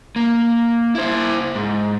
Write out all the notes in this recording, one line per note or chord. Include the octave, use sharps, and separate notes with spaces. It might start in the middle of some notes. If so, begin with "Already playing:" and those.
A#3
E4 C5
G#2